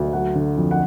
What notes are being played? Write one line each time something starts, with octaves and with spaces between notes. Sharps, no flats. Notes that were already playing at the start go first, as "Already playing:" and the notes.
Already playing: D2
F#3 F#5
D3
F2
F#5